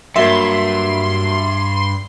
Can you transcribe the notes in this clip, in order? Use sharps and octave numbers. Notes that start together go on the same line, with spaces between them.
G2 F#3 A#3 E5 C6